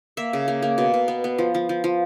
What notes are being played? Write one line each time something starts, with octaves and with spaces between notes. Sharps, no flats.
A#3 E5
C#3
A#3
A#3
B2
B2
B3
B3
F3
F3
F3
F3